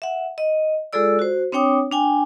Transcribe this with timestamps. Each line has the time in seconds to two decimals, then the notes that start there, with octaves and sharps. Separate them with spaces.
0.02 E5 F#5
0.38 D#5
0.93 G#3 F4 G#4 A4 D5 E6
1.19 F#4 C5
1.52 C4 D4 C#5 G5 D6 D#6
1.92 D4 G5 G#5